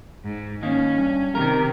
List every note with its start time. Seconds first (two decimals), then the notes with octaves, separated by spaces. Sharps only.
0.24 G#2
0.63 D#3 A#3 C#4
0.98 G2
1.35 C3 D#3 A#4